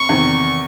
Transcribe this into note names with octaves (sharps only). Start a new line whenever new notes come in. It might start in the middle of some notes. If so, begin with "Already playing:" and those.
Already playing: F1 C#6
E2 C3 D#3